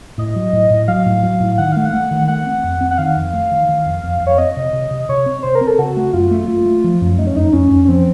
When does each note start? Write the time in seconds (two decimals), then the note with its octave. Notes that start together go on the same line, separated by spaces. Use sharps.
0.18 A2 D#5
0.36 F#3
0.53 A2
0.70 A2
0.88 F#3 F5
1.06 A2
1.23 F#3
1.40 A2
1.58 D#3 F#5
1.72 A3 F5
1.85 F#5
1.94 A3
2.11 D#3
2.28 A3 F#5
2.46 C4
2.64 F2
2.81 C4
2.91 F#5
2.98 D#3 F5
3.16 F2
3.33 A3
3.51 D#3
3.68 D#3
3.86 F2
4.03 F2
4.21 F2
4.27 C#5
4.38 C4 D#5
4.57 C3
4.73 C3
4.91 C3
5.09 C3 C#5
5.26 C4
5.43 C3 C5
5.55 A#4
5.61 C4
5.67 A4
5.78 C#3 F#4
5.97 A3
6.13 F#2 F4
6.31 A3
6.48 A3
6.66 A3
6.84 F3
7.01 F#2
7.18 A3 D#4
7.27 C#4
7.36 F2 D#4
7.53 F2 C#4
7.71 F2
7.85 C#4
7.88 F3 C4